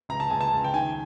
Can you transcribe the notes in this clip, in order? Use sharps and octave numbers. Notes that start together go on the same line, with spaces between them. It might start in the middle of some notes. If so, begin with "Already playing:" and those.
C#2 A#5
A5
C#2 G#5
A5
C#2
G5
D#3 G#5